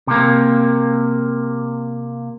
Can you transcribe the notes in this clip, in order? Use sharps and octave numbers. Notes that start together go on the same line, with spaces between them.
C3 A#3